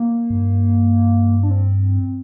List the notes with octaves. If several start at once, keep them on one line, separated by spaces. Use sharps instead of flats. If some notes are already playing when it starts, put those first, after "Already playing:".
Already playing: A#3
G2
D4
C4